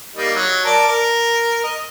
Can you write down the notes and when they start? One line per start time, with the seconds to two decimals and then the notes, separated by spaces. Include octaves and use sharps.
0.16 G3 A#3 D#4
0.35 F#3
0.66 A#4 D5 A5
0.87 A#4
1.64 D#5